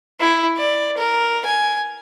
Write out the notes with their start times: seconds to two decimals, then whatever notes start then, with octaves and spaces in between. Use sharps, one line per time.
0.20 E4
0.57 D5
0.97 A#4
1.45 G#5